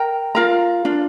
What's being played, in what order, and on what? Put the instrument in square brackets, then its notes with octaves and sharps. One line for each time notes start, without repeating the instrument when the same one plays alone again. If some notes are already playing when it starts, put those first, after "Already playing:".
Already playing: [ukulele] A#4 G5 A#5
F4 A#4 F5 A#5
D4 F4